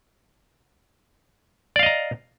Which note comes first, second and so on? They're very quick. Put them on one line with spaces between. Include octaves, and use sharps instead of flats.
D5 F5 D#5 A#5